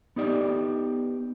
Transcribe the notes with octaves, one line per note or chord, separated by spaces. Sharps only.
B3 D#4 G4 D5